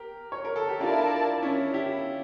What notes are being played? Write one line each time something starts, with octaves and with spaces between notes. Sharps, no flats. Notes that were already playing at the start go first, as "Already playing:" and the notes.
Already playing: G4 A#4
C#5
A#4
A4
G4
D4 E4 F4 A#4 D5 A5
C#4 E4
E4 G4